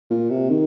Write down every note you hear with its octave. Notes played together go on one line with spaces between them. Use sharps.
A#2
C3
D#3